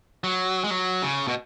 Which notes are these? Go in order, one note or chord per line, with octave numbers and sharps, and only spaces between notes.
F#3
G#3
F#3
C#3
B2